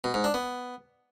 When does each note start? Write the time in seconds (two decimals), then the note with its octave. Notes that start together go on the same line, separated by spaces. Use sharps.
0.04 B2
0.14 G#2
0.24 D4
0.34 B3